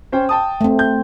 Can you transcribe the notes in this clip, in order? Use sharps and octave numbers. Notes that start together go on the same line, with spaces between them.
C#4 C5 G5
G5 A5 D#6
A3 C4
G6